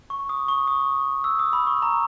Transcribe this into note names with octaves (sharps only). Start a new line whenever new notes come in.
C#6
D#6
C#6
D#6
E6
D#6
B5
C#6
A#5